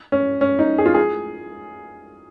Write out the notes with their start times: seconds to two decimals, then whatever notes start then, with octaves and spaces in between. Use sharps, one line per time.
0.12 C#4
0.41 C#4
0.59 D#4
0.78 G#4
0.86 F4
0.94 G#4